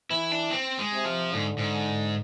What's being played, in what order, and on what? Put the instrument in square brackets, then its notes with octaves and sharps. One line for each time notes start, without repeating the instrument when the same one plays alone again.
[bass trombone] E3 [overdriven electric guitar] E4
[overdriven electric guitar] D4
C4
G#3
[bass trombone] C3
[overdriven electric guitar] F3
[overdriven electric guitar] G#2 [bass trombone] D3
[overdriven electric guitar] G#2